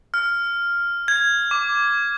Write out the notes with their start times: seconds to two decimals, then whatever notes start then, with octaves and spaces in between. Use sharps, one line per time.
0.14 F6
1.08 G#6
1.51 D6